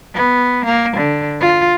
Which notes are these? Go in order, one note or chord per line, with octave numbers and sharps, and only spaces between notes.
B3
A#3
D3
F4